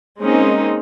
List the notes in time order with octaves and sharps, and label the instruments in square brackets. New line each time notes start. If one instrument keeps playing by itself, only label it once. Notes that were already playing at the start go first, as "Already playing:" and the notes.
[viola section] G#3 A#3 C4 C#4 D#4